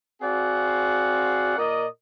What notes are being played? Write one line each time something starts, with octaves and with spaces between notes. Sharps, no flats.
C4 F#4 G#4 D5 F5 F#5
A#2 A#4 D5 D#5